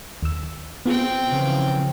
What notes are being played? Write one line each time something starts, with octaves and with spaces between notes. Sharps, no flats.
D#2 E6
B3 C4 F4 G#4 G5
C#3 E3 F3